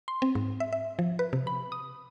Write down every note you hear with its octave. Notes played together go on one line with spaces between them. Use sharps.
C6
C4
G#2
E5
E5
F3
B4
C3
B5
D#6